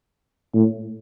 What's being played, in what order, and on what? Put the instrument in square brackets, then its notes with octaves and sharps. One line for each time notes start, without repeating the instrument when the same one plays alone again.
[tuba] A2